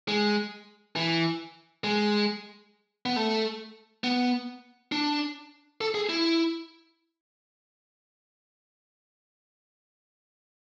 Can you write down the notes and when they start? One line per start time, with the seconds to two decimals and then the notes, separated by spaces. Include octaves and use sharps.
0.08 G#3
0.96 E3
1.84 G#3
3.06 B3
3.16 A3
4.04 B3
4.92 D4
5.81 A4
5.95 G#4
6.09 E4